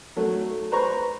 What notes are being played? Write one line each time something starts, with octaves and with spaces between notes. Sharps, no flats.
F#3 A3
B4 C5 A#5 C#6